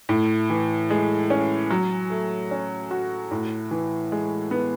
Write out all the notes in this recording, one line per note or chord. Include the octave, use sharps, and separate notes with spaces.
A2
E3
G#3
C#4
F#3
A3
C#4
F#4
A2
E3
G#3
B3